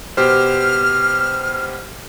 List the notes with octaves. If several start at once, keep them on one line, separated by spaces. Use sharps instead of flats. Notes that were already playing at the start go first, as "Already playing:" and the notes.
B2 G4 C5 F6